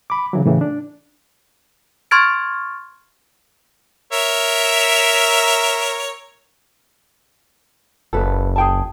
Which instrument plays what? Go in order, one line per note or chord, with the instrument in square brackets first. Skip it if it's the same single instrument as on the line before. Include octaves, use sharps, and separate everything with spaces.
[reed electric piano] B5 D6
C#3 E3 F#3
A2 C#3 E3
D4
[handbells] C6 C#6 F6 G#6 A6 D7
[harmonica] A#4 C#5 E5
[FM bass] F#1 [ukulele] A4 B4
[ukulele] G#4 G5 A5